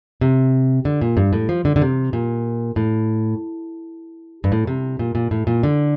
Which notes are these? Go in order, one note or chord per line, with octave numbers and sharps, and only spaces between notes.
C3
D3
A#2
G2
A2
F3
D3
D3
C3
A#2
A2
G2
A2
C3
A#2
A#2
A2
A#2
D3